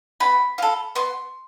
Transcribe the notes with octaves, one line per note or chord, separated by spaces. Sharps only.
B3 B5
F4 A4
B3 C6